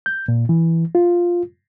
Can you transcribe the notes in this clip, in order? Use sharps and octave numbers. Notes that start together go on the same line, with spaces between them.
G6
A#2
E3
F4